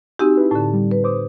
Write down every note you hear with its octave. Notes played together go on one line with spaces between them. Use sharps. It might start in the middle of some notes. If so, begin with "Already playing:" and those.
C4 D#4 F#4 G4 G#5 E6
E4 B4
A2 D3 A5
G3
B4
C5 D6 D#6